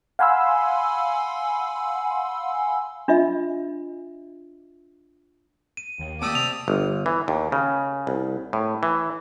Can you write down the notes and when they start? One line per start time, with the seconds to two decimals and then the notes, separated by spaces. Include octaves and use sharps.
0.19 F5 F#5 G#5 B5 C6 E6
3.08 D4 F4 D#5 E5
5.77 D#7
5.99 D#2
6.22 A#3 B3 G4 D5 A5 D#6 E6 D#7
6.35 C3 F7
6.68 G1
7.06 E3
7.28 D#2
7.52 C#3
8.07 C2
8.53 A2
8.83 E3